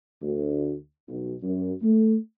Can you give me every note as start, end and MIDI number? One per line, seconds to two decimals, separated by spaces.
0.22 0.74 38
1.08 1.33 35
1.43 1.73 42
1.82 2.16 57